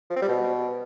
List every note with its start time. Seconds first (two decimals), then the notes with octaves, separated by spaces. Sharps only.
0.10 F3
0.16 C4
0.22 G3
0.28 B2